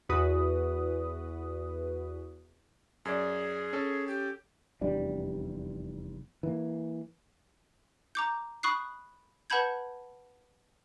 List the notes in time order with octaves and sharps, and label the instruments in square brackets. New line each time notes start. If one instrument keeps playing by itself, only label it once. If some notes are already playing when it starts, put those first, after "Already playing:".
[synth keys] E2 F#4 B4 D#6
[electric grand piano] F#2 D5 [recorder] G#4
[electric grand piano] C#4 A4
[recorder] G4
[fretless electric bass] F1 E2 G3 D4
E3 A#3
[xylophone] A#5 D6 G6
B5 C#6 D#6 F#6 C7
B4 F#5 A5 B5 G6 G#6